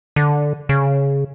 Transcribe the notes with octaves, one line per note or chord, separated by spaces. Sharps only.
D3
C#3